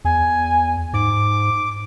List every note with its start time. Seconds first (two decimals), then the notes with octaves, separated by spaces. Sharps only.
0.05 E2 G#5
0.93 G#2 D6